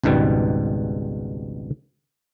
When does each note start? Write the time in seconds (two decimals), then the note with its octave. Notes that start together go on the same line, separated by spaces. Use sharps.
0.04 G#1 C#2 G#2 B2 G3